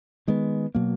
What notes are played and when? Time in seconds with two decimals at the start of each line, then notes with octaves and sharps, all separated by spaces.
0.28 D#3 G#3 B3
0.75 B2 F#3 A#3